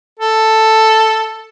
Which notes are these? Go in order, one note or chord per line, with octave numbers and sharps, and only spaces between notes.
A4